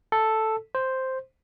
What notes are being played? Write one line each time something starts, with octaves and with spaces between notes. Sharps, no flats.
A4
C5